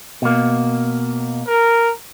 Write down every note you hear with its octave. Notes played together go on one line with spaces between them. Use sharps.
B2 A#3
A#4